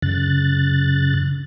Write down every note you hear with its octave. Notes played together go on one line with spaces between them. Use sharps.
F#2 C#3 F#6 A6